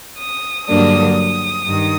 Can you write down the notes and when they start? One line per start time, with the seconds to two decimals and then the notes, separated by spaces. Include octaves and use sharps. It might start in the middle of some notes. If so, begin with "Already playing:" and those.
0.19 D#6
0.68 G2 D3 F#3 A#3 D4 D#6
1.18 D#6
1.67 G2 D#3